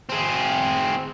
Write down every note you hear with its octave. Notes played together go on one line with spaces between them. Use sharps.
C4 G#4